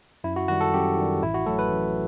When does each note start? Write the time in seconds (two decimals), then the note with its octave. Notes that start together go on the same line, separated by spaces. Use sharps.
0.24 F#2 E4
0.36 F#4
0.48 D#3 G3 F#4
0.61 A4
0.73 F#2 G4
0.97 D#3 G3
1.22 A1 E4
1.34 F#4
1.46 A2 F#3 A4
1.59 B4
1.71 A1